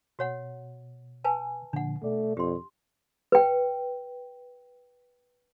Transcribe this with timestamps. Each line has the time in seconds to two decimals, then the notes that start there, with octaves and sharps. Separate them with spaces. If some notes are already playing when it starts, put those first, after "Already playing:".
0.19 B2 F#4 C#5 F#5
1.24 B4 G#5 A5
1.73 A#2 D3 F3 D4 F#5
2.03 B2 A3 D5
2.37 F2 G4 C6
3.32 B4 G5